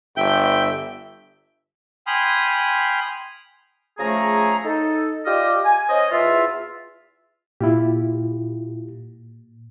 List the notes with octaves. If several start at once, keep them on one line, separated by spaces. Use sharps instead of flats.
G1 E5 G5 G6
G5 G#5 B5 C6 D#6 F6
C#3 F3 A3 G#4 A#5
D#4 A4
F4 G4 D5 D#5 D6 F6
G#5
C#4 C5 C#5 D#5
E2 F4 E5
A#2 E4 F4 G4